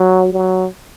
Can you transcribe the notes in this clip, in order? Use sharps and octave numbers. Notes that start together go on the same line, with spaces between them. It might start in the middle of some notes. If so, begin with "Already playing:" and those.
Already playing: F#3
F#3